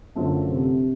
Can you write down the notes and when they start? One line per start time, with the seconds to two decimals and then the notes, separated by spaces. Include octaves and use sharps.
0.15 F#2 D3 F3 F#3 A3
0.47 C3